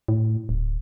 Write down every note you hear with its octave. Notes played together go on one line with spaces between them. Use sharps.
A2
D1